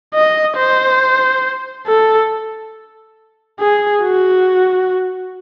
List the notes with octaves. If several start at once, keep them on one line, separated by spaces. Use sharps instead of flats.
D#5
C5
A4
G#4
F#4